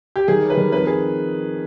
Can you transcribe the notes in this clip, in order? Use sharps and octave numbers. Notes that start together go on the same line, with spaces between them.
G4
D#3 G#4
G3
B4
D#3
F2 B4
G#4